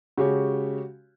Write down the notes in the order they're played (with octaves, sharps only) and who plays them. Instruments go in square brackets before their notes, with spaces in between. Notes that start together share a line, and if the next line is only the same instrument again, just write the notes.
[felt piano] C#3 G#3 [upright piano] F#4 G4 C#5